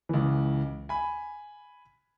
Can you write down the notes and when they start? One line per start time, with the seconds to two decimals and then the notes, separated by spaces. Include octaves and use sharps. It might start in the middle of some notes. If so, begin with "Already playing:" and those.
0.09 C#2 E3
0.89 G#5 B5